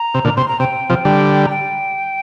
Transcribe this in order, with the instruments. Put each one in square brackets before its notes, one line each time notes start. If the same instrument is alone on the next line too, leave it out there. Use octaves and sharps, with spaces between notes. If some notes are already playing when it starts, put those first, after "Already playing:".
Already playing: [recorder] A#5
[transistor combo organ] C3
A#2 D3
[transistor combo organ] C3 [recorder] C6
[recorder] A#5
[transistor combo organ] C3 [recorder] G5
[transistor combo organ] C3 F3
D3 G3
[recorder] A#5
G5